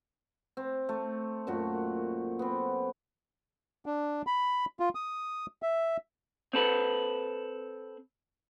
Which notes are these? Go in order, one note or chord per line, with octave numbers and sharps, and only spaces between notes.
C4
A3
F#2 A#2 A3 F#4
B3 C4
D4
B5
F4
D#6
E5
C4 A4 B4